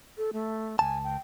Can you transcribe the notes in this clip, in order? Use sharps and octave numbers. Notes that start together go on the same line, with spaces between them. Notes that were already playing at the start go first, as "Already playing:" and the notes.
A4
A3
C#2 G#5 A5
G5